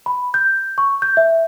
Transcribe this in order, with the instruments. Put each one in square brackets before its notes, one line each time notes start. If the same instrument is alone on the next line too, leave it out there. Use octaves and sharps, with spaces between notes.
[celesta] B5
G6
C#6
G6
E5